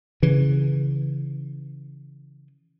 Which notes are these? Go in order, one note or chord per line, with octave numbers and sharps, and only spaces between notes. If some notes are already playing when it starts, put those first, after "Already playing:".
C#3 E3